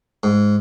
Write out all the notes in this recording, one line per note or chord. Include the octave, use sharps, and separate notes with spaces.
G#2